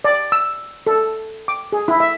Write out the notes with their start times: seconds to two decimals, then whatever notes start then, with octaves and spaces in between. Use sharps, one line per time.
0.04 D5
0.32 E6
0.87 A4
1.48 D6
1.72 G#4
1.88 E4
2.00 E5